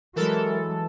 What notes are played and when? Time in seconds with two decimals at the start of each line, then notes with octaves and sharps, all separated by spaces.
0.16 E3 F#3 G#3 A4 A#4